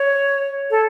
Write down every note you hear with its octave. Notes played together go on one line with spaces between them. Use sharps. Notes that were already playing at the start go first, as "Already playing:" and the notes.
Already playing: C#5
A4